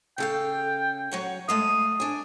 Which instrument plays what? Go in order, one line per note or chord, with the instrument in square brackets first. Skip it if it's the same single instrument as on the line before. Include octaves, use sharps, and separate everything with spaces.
[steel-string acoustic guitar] C#3 A4 F5 [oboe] G5
[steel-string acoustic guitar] F#3 C#5 F#5
[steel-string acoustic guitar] G#3 A3 F5 [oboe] D#6
[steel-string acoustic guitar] D4 G#5